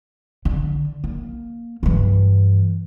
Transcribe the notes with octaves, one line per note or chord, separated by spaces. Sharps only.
D3
A#3
G2 E3